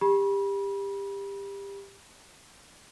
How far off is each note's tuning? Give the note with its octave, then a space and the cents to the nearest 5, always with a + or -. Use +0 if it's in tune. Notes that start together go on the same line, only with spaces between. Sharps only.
G4 +25 B5 -30